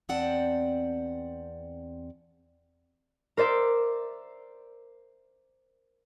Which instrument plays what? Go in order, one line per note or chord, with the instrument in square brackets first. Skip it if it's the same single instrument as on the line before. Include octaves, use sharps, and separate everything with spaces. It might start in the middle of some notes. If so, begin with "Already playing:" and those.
[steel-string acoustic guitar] E2 C4 D5 F#5 G5 A5
[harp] A#4 C5 D5 E5